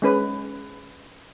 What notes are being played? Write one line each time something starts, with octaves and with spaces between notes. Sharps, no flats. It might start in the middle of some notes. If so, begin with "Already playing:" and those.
G#3 C#4 B4